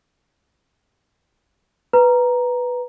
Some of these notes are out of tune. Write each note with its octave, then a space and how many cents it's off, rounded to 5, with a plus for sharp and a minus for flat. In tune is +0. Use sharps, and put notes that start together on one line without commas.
B4 +0 A#5 +5